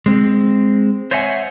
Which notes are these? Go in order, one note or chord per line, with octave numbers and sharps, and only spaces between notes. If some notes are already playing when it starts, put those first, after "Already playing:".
G#3 C4
C5 C#5 D#5 E5 F#5 G#5